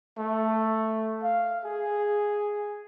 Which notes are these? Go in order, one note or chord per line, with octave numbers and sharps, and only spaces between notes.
A3
F5
G#4